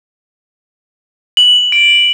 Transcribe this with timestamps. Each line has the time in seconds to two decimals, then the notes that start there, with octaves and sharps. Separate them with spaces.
1.37 F#7
1.72 D7